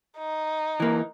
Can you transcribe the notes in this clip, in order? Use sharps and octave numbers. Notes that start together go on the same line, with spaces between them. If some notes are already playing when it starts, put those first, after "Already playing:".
D#4
E3 A#3